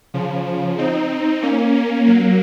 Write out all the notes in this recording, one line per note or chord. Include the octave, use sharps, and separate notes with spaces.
C#3 F3
C4 D#4
A#3 C#4
A#3 C#4
F#3 A#3